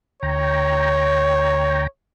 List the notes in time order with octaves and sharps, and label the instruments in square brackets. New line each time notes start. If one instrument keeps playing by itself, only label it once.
[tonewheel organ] D2 G5 A#5 [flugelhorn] C#5